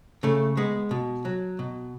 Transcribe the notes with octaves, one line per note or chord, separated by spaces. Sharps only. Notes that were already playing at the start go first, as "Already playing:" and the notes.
C#3 A3
G#3 B3
B2
F#3
B2